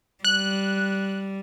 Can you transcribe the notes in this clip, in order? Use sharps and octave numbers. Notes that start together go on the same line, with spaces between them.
G3 F#6